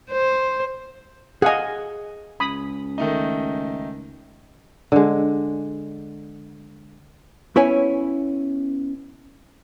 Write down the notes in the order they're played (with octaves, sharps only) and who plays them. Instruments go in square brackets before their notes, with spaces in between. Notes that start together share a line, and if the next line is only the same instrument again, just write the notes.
[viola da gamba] C5
[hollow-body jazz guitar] G#4 G#5 [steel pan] D#5 F5 F#5
[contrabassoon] C#2 [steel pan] B5 D#6
[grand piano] D#3 A3 D#4
[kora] D3 G#3
[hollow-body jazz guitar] B3 C#4 E4 B4 C#5 G#5